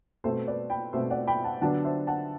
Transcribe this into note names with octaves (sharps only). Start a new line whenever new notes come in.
B2 A3 C4 A4 C5
B4 D5
G5 B5
B2 A3 C4 C5 E5
D5 F#5
G5 B5
F#5 A5
D3 F#3 B3 D4 F#5 A5
C5 E5
F#5 A5